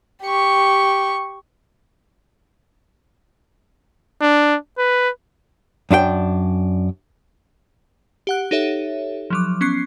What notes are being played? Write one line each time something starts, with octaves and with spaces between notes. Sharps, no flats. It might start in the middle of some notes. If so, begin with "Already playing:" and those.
G4 C#6
D4
B4
F#2 D4 F4 G5
G4 F#5 F#6
D#4 G4 A4 C#5 E5
F3 F#3 D6
B3 C#4 C#6 F#6 C7